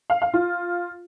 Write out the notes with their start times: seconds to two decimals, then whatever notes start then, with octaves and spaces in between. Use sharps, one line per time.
0.10 F5
0.22 F5
0.34 F4